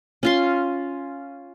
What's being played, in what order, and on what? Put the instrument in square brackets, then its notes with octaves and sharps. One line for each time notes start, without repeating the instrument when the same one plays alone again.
[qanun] C#4 F4 C6